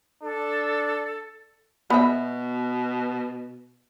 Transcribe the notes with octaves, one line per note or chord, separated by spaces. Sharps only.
D4 A4
B2 B3 E5